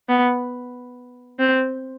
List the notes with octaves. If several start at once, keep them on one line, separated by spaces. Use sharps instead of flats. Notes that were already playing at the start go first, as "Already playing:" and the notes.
B3
C4